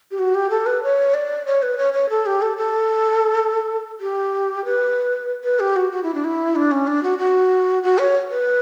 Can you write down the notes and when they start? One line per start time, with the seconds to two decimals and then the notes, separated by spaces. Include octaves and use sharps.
0.11 G4
0.19 F#4
0.35 G4
0.50 A4
0.66 B4
0.83 C#5
1.14 D5
1.46 C#5
1.62 B4
1.78 C#5
1.93 C#5
2.10 A4
2.26 G4
2.42 A4
2.57 A4
4.00 G4
4.65 B4
5.44 B4
5.60 G4
5.76 F#4
5.92 F#4
6.03 E4
6.14 D4
6.24 E4
6.56 D4
6.72 C#4
6.87 D4
7.03 F#4
7.19 F#4
7.83 F#4
7.99 C#5
8.30 B4